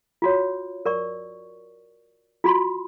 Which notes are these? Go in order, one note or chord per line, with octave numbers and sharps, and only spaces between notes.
F4 F#4 C#5
A#4 D5 C#6
F4 F#4 B5 C6